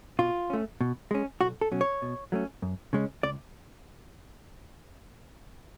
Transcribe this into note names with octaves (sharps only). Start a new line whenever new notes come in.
B2 F4
A3 C#4
B2
G#3 C#4
B1 F#4
A4
B2 F#3 C#4
C#5
B2
F#3 A3 C#4
F#2
C#3 G#3 C#4
C#2 D5